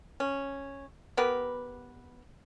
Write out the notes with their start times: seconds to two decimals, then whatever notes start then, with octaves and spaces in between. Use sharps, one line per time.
0.20 C#4
1.17 B3 G4 A#4 B4